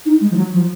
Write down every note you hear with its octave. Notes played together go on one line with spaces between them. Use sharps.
D#4
G#3
F3
F#3
F3